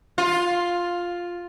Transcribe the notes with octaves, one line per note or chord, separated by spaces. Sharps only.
F4